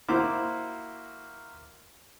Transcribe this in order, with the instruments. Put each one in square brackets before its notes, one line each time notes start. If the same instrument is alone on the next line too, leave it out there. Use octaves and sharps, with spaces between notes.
[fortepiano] A#3 E4 F#4 C5 D6 F6